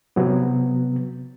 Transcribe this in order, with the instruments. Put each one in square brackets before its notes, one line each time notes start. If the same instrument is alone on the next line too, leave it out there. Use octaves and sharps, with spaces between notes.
[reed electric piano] C3 F#3 B3